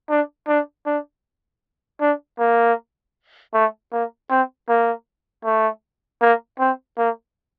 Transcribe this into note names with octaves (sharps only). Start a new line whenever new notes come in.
D4
D4
D4
D4
A#3
A3
A#3
C4
A#3
A3
A#3
C4
A#3